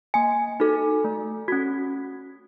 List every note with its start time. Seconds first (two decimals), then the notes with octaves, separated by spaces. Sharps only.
0.14 A#3 G#5
0.60 D#4 F#4 A4
1.04 A3
1.48 C#4 F#4